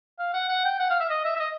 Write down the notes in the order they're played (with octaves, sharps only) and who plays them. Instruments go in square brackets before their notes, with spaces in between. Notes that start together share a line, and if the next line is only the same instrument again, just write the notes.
[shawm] F5
F#5
F#5
G5
F#5
F5
E5
D#5
E5
E5
D#5